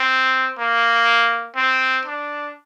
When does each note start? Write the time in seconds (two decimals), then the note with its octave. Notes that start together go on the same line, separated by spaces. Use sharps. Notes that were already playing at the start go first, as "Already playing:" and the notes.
Already playing: C4
0.59 A#3
1.56 C4
2.05 D4